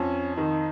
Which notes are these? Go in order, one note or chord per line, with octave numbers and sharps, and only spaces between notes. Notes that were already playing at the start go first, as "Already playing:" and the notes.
Already playing: F2 C#4
D#3 D#4